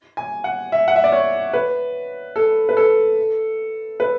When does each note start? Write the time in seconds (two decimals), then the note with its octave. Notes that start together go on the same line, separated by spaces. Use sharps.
0.17 G#5
0.44 F#5
0.72 E5
0.88 F#5
0.96 E5
1.04 D5
1.12 C#5
1.53 B4
2.36 A4
2.69 B4
2.77 A4
4.00 B4